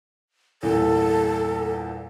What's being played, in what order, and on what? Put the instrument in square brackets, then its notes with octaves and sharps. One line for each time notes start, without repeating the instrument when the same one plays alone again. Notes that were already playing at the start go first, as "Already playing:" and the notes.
[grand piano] E2 G2 A#2 [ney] A4